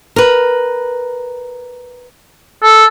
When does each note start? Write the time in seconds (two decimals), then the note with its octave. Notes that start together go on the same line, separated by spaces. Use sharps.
0.16 A#4 B4
2.63 A4